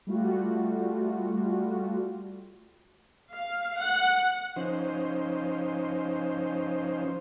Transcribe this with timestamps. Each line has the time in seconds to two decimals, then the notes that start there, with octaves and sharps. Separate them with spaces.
0.07 G3 A3 F4 F#4
3.32 F5
3.80 F#5
4.56 F3 C#4 D#4 C5